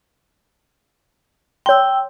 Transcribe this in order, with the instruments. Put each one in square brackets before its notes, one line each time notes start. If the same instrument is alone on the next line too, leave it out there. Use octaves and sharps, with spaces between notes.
[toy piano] C#5 C6 [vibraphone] G5 E6